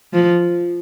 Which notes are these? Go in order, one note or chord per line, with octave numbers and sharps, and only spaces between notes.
F3